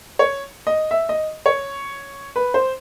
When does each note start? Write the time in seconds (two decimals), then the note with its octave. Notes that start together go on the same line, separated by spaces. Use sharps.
0.19 C#5
0.67 D#5
0.91 E5
1.09 D#5
1.46 C#5
2.36 B4
2.54 C5